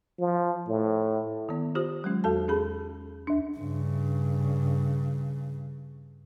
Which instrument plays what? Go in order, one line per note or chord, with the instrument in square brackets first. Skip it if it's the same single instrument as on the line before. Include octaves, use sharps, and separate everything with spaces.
[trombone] F3
A2
[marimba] D#3 B3
F4 G4 C5 D#6
F#3 G#3 C#4
E2 F#4 A4 A5
C#4 G4 G#4 B5
D#2 D4
[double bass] G2 C#3